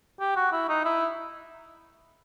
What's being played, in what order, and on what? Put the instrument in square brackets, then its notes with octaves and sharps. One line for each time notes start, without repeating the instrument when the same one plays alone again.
[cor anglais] G4
F#4
E4
D#4
E4